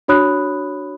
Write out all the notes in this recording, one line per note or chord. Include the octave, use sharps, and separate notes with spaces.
D4 F#4 C#5 B5 D#6 F#6